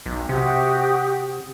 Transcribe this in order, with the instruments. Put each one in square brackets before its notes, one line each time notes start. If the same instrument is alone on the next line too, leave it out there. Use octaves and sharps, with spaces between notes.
[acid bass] B1
[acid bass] C3 [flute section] F#4 G4 D#6